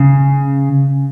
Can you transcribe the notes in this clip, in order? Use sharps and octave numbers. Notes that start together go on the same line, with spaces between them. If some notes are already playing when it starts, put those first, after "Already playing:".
Already playing: C#3